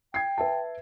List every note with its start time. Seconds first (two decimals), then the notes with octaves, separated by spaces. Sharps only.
0.14 G5 G#6 C7
0.38 B4 E5 A5